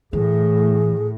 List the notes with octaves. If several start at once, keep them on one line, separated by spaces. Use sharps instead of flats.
A2 E3 G#4